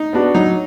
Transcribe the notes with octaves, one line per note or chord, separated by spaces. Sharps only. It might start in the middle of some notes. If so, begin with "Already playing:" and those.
Already playing: D#4
B3 D4 F#4
F#3 D#4